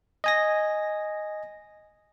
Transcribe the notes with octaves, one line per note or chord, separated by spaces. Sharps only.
D#5 G#5 A#6